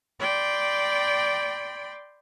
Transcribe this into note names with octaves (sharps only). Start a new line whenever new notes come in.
D5 G5 B5 C6